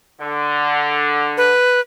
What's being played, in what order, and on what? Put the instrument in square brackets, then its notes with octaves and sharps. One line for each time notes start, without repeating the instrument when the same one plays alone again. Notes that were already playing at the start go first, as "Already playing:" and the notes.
[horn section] D3
[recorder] B4